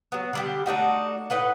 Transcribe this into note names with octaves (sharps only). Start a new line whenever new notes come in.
F#3 B3
D3 G3 G4
A3 D4 D#4 F#4
A2 D#4 B4 F#5